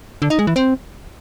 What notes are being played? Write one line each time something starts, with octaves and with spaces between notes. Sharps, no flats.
D3
D#4
G#3
E3
C4